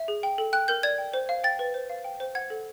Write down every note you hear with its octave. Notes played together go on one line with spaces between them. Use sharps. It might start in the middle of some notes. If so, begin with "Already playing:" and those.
Already playing: E5
G#4
G5
A4
G5 F#6
A#4 G6
D5 G#6
G5
C5
F5
G5 A6
B4
C5
F5
G5
C5
F#5 G#6
A4